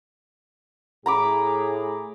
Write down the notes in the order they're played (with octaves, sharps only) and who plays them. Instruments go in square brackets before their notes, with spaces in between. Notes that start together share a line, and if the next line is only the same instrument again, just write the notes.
[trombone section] A2 G#4 [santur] A#5 B5 D6